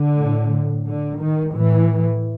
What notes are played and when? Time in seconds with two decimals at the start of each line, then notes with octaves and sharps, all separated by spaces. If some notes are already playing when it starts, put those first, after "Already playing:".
Already playing: D3
0.18 A2
0.87 D3
1.21 D#3
1.54 A2 E3